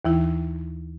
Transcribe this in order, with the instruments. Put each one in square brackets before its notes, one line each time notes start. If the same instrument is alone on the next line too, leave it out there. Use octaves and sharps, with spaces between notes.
[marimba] D#2 E3 E4 G5